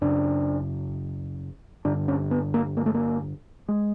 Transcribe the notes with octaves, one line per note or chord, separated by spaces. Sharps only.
F#2 C#3 D4
G2 D3 D4
C#4
B3
A#3
A#3
A3
A#3
G#3